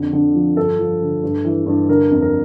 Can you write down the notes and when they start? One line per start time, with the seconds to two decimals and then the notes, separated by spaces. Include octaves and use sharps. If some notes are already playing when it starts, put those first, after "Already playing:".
Already playing: F2 D3
0.13 D3
0.35 F3
0.57 G2 A4
0.79 F3
1.01 D3
1.23 G2
1.45 E3
1.66 G2
1.89 D3 A#4
2.11 F2
2.22 A#4